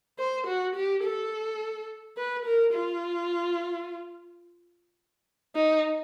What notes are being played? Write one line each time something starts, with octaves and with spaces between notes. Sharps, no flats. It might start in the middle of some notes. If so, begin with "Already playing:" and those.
C5
F#4
G4
A4
B4
A#4
F4
D#4